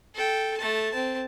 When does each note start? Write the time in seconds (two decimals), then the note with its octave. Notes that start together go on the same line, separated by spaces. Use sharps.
0.15 A4 G5
0.57 A3 A5
0.92 C4 A5